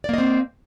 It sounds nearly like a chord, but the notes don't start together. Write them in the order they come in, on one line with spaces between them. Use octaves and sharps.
D5 A#3 D#5 C4